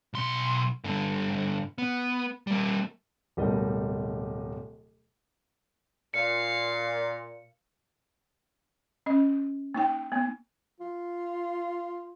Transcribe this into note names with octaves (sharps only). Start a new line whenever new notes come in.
B1 C6
G2 D3
B3
G3 A#3
D1 B2 G3 A#3 D#4 D#5
A#2 F5 C#7
C#4 D#5
A#3 D#4 G5
A#3 B3
F4